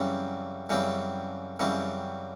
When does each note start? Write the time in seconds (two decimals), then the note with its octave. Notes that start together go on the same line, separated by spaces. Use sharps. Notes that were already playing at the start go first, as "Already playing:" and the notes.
Already playing: F#2 C#3 E3 G3 C4
0.69 F#2 C#3 E3 G3 C4
1.59 F#2 C#3 E3 G3 C4